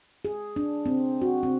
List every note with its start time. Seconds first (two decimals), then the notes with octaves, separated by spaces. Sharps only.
0.25 G#4
0.56 D4
0.86 C4
1.22 F#4
1.43 C4